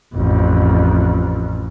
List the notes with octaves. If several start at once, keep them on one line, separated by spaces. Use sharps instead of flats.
A1 F2